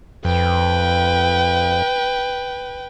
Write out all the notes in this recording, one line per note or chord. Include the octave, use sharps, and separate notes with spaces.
F2 B4 G5